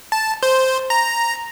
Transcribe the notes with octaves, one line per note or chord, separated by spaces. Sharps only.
A5
C5
A#5